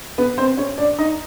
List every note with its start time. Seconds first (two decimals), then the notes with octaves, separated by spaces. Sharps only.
0.18 B3 B4
0.38 C4 C5
0.57 C#4 C#5
0.78 D4 D5
0.99 D#4 D#5